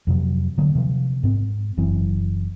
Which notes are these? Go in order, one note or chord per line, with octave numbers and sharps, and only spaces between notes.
F2 C3 F#3
D3 F#3 A#3
C3 F3 A#3
G#2 C4
F#1 F#2 E3 C4